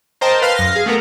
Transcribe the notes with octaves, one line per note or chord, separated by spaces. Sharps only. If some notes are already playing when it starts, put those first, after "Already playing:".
A#4 C5 D#5 G5 A5
B4 F5 C6 F6
F#2 F5 A#6
G#4 F5
A3 B3 A#4